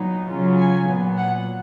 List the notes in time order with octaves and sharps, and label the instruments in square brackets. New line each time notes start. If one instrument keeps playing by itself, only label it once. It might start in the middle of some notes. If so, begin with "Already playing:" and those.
Already playing: [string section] A#2 F#3 B3 D#4
C#3 F#3 C#4 F4
G#5
A#2 F#3 B3
F#5